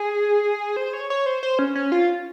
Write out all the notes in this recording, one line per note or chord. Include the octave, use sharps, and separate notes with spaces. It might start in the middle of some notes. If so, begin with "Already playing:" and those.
Already playing: G#4
C5
C#5
C#5
C5
C5
C#4
C#4
F4